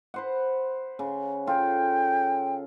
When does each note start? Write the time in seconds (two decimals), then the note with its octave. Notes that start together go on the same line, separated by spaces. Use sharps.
0.14 B4 C5 F#5
0.99 C#3
1.47 F4 A4 G5